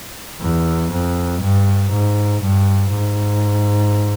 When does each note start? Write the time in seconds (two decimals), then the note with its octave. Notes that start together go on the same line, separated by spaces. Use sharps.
0.41 E2
0.91 F2
1.41 G2
1.91 G#2
2.41 G2
2.91 G#2